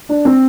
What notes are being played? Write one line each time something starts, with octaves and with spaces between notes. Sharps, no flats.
D4
C4